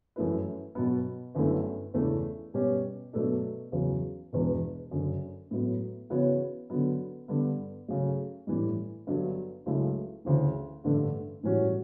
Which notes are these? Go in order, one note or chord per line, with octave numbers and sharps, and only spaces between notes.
F#2 E3 A3 E4 B4
B2 F#3 B3
G1 F#2 D3 A3 E4
E2 C#3 E3 A3 D4
B2 G3 C#4 G4
B2 F#3 A3 D4 A4
E2 C#3 F#3
E1 E2 B2
F#1 F#2 D3
A2 F#3 B3
C#3 E3 B3 F#4 C#5
D3 F#3 B3
G2 D3 G3 B3 D4
C#3 F#3 A3
A2 E3 G3
G1 G2 D3 F#3
C#2 C#3 F#3 A3 E4
D2 C#3 E3
A1 G2 D3 A3 D4
A2 E3 G3 C#4 F#4